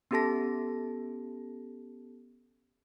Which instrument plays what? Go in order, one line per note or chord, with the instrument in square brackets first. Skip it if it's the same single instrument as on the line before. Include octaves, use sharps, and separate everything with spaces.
[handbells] B3 C#4 G4 A4 A5 A#6